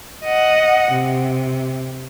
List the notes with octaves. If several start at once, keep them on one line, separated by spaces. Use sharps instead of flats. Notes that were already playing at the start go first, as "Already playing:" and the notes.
D#5 F#5
C3